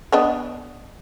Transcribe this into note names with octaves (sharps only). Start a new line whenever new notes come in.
B3 D4 D#5